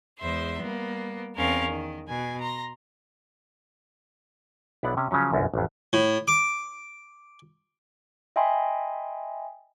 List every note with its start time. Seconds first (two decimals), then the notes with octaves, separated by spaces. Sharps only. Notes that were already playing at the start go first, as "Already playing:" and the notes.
0.18 E2 G#3 C5 E5 C6
0.59 G3 A#3 B3
1.37 E2 C4 C#4 A#4 F5
1.68 D#3
2.08 B2 G#5
2.40 A#5 C6 A#6
4.83 B1 B3 D4 E4 D5 F#5
4.97 C3 C#4
5.11 C#3 F3 F#3 C#4
5.33 G1 C2 F#2
5.54 A1 F2
5.93 A2
6.28 D6
8.36 D#5 E5 G5 G#5 B5 C6